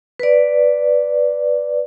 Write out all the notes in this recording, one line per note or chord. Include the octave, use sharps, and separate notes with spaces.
B4 D5